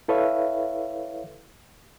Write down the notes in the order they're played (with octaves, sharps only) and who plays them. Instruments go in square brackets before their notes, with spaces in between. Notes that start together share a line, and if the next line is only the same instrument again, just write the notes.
[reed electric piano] E4 A4 B4 C#5 E5 F5